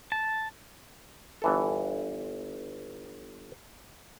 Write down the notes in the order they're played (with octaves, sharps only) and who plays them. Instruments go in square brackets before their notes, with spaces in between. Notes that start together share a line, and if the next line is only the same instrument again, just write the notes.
[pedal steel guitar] A5
[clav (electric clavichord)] G1 E3 A4